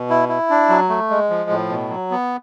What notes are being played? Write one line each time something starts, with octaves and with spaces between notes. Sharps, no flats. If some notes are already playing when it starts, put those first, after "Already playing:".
Already playing: B2
E4
E4
D4
F#3
A3
G#3
F3
A2
B2
F#3
B3